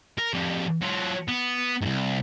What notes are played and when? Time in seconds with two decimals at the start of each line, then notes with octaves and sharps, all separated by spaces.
0.18 A#4
0.33 F2 G3
0.82 F#3 F4
1.28 B3
1.81 C2 G#2